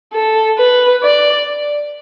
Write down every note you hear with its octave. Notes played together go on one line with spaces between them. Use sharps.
A4
B4
D5